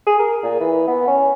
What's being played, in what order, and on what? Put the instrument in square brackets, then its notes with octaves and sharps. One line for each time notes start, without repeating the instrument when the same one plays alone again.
[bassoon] G#4
A#4
A#2
E3
B3
C#4